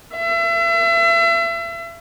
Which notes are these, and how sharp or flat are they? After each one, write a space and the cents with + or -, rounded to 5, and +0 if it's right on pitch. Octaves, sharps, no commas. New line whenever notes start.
E5 +35